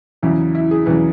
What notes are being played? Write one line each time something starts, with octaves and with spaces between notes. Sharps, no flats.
E2 C#3 F#3 E4
E4
G#4
E2 C#3 F#3 B4